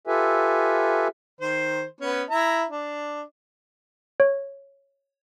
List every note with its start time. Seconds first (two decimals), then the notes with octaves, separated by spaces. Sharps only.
0.07 F4 G4 A4 B4 E5 G#5
1.41 D#3 C5
2.01 B3 C#4
2.30 E4 E5 A#5
2.69 D4
4.20 C#5